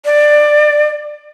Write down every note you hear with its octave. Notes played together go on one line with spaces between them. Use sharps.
D5